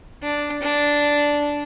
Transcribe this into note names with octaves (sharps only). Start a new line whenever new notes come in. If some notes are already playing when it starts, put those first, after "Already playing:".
D4
D4